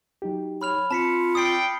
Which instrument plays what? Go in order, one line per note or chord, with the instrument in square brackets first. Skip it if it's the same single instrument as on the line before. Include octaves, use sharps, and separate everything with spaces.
[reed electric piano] F#3 D#4 G4
[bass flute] C#5 [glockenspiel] B5 F6 F7
[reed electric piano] C4 [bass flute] F4 [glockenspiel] A5 B6 C#7
[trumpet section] A4 D5 G5 [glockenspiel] D#6 C7